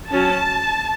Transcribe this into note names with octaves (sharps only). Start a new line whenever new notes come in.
F#3 C#4 A5